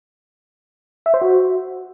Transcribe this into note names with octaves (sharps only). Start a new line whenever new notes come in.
E5
C5
F#4